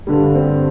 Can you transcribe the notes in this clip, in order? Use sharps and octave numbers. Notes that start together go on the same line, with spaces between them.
G2 D3 G3
C4